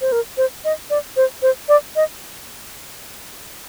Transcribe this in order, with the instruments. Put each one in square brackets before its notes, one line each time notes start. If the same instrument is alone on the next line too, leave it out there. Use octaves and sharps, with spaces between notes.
[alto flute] C5
A#4
C5
D#5
D5
C5
C5
D5
D#5